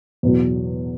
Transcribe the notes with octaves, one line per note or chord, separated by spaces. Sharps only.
E2 B2 F#3